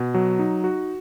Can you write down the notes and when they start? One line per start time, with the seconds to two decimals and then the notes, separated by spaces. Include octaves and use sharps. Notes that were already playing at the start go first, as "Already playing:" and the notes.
Already playing: B2
0.14 F#3
0.39 D#4
0.64 F#4